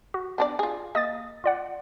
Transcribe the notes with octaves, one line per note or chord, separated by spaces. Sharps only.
F#4
B3 D4 D5
F4 G#4
A#3 D#5 D#6 A6
F4 D5 F#5